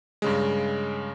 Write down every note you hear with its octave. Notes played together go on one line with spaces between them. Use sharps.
G2 C#3 G#3